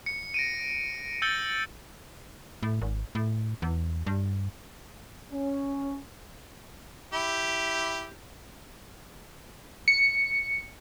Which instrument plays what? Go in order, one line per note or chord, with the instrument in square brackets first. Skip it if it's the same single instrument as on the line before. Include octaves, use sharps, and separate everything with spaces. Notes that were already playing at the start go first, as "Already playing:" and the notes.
[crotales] C#7
A#6 D7 D#7
E6 G6 A6 C#7 G7
[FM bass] A2
G#1
A2
E2
G2
[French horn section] C#4
[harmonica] E4 G4
[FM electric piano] C#7